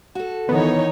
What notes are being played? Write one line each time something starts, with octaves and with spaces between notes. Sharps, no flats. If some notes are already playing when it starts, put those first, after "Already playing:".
F#4 A4
D#3 E3 B3 D#4 C#5